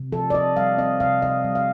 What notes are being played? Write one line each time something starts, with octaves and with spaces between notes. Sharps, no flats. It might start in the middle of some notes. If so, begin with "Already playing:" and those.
Already playing: C3
F3 A4
D5
C4 D#5
G3 F5
C4 D#5
C3 F5
C3 D#5
G3
F5